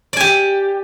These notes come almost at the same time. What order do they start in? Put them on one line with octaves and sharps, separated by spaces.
D5 G#5 G4